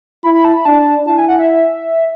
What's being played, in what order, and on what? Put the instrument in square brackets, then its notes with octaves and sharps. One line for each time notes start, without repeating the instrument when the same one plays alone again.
[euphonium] E4 [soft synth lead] B5
[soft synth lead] B5
A5
B5
[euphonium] D4 [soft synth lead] A5
[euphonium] E4 [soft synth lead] A5
[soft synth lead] G#5
F#5
E5